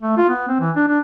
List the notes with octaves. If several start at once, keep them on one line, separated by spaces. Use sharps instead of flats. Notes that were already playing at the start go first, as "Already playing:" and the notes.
A3
F4
B3
C4
E3
D4
D4